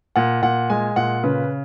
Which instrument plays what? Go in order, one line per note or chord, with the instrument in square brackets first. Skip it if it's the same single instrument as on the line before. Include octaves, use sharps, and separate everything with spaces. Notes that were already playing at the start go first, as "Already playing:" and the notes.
[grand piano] A#2 F#5
A#2 F#5
G#3 G#5
A#2 F#5
C#3 B4